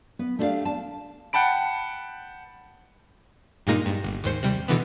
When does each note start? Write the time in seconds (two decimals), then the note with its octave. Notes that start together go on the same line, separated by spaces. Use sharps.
0.19 B3
0.39 A3 D4 E4 G4 D5 F5
0.65 A5
1.33 F#5 G5 A5 B5 D7
3.67 G2 A#2 G#3 A#3 D#4
3.86 G2
4.04 G1
4.24 D#2 G#2 C5 C#7
4.43 C3 G3
4.68 B2 D3 E3 B3